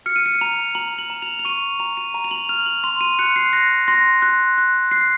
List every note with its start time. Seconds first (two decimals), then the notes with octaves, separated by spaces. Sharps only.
0.06 F6 C#7
0.16 D#7
0.26 C#7
0.35 D#7
0.41 A#5 F7
0.75 A#5 F#7
0.98 F#7
1.10 A#5
1.22 F7
1.39 F7
1.45 C#6 D#7
1.79 A#5 F7
1.97 D#7
2.14 A#5 D#7
2.24 F7
2.31 F#7
2.49 F6 F7
2.66 F#7
2.84 C6 F7
3.01 D#7
3.19 F#6 C#7
3.36 C7
3.53 F#6 A#6
3.88 C6 A#6
4.22 F#6
4.58 F#6
4.91 F#6 C7